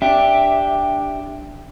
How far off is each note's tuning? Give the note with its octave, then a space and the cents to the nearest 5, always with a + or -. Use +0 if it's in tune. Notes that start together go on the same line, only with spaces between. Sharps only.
D4 +0 G4 +5 E5 +5